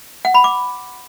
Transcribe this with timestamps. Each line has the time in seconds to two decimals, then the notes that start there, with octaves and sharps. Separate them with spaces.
0.25 F#5
0.34 B5
0.44 D6